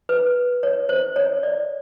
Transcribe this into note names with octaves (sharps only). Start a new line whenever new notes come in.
B4
C#5
C5
C#5
D5